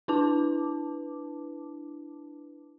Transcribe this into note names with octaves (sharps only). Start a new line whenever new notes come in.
D4 E4 B4 A5 D6